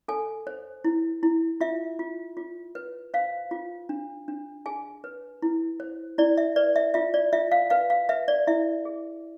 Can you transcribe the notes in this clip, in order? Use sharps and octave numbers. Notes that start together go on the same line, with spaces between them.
A4 G#5
C5
E4
E4
F4 E5
F4
F4
B4
C5 F5
F4
D4
D4
G#4 G#5
B4
E4
C5
E4 D5
E5
B4 D5
E5
F4 E5
D5
F4 E5
F5
B4 F5
F5
B4 E5
D5
E4 E5
G#4